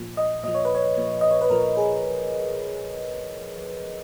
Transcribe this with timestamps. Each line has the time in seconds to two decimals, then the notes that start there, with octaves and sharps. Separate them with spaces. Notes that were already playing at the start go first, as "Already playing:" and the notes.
Already playing: A#2 F3
0.17 D#5
0.43 A#2 F3 D#5
0.55 C#5
0.65 B4
0.75 C#5
0.97 A#2 F3
1.21 D#5
1.31 C#5
1.41 B4
1.50 A#2 F3 A#4
1.77 G#4